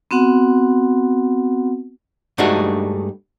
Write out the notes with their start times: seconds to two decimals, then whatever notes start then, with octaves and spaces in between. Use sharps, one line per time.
0.11 B3 C4 F#4 F#5
2.38 G2 G#3 A3 D4 D#4 F#4